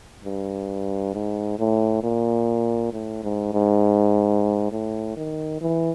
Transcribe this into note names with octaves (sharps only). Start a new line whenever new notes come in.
G2
G#2
A2
A#2
A2
G#2
G#2
A2
D#3
E3